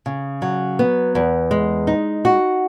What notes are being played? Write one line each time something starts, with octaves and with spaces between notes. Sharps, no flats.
C#3
F#3
B3
E2
G#3
D#4
F#4